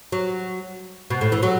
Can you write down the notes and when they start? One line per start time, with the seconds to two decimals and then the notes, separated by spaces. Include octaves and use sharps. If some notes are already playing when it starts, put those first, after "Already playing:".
0.12 F#3
1.10 B2
1.21 A2
1.32 E3
1.43 F#3